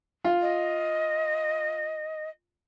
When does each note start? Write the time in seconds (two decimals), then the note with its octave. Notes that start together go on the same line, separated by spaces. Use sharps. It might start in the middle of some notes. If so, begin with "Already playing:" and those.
0.24 F4
0.42 D#5